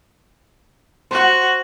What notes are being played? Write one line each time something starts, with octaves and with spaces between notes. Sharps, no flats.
F#4 C5 F#5